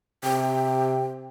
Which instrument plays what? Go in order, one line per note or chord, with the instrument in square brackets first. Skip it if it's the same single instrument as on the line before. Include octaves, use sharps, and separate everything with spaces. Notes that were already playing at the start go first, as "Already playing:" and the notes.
[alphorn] C3 [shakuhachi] G5